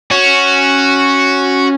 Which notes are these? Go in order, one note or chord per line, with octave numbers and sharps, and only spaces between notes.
C#4 F#4